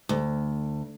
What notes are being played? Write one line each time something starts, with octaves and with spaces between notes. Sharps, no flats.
D2